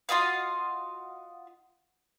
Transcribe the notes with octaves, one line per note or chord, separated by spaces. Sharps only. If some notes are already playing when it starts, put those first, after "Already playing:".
F4 F#4 D#5 F5